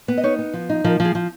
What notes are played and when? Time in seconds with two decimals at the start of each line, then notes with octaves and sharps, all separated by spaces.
0.08 B3
0.17 D#5
0.24 D#4 C#5
0.39 B3
0.54 F3
0.69 D#4
0.84 F3 A#4
1.00 F3
1.05 G#4
1.15 F3